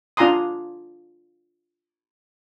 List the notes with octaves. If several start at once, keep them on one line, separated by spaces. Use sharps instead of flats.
D4 F4 G#5 A#5 C6 D#6